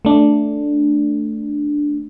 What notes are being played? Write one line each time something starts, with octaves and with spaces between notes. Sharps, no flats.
A3 D4